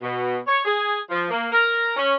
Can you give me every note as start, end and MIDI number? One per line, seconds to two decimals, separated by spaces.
0.01 0.37 47
0.46 0.64 73
0.64 0.97 68
1.10 1.29 53
1.30 1.46 58
1.52 1.94 70
1.95 2.13 61